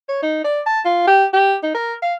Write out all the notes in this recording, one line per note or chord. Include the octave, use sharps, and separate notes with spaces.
C#5
D#4
D5
A5
F4
G4
G4
D#4
A#4
F5